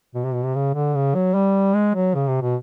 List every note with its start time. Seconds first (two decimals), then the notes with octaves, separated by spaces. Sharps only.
0.15 B2
0.25 C3
0.34 B2
0.45 C3
0.55 C#3
0.74 D3
0.95 C#3
1.15 F#3
1.34 G3
1.75 G#3
1.95 F#3
2.15 C#3
2.28 C3
2.42 B2